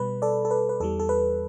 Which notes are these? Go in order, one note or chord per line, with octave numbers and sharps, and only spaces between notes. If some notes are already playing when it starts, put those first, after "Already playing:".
Already playing: B2 G3 B4
A4 D5
A4
B4
B4
E2 E3 G3 A4
A4
B4